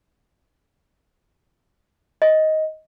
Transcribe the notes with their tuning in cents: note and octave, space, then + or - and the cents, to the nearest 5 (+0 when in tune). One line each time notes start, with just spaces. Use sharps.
D#5 +10